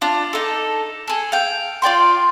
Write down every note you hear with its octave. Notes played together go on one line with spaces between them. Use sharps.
D4 F4
D#4 A4
G#4 A4
F5 G5
F4 D5 G5 C6